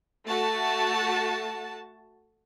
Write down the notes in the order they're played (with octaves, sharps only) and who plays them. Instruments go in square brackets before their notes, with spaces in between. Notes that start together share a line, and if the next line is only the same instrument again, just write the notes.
[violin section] A3 F#4 A5